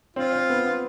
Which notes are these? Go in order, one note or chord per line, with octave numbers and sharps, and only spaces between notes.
C4 F4
C4
B3
B3